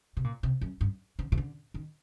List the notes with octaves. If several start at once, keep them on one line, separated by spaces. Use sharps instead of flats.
C3
A#2
C3
F#2
G2
D3
C3
D3
D#3